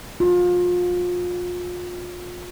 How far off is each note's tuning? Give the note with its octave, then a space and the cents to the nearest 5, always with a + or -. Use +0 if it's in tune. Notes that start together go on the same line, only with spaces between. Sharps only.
F4 +30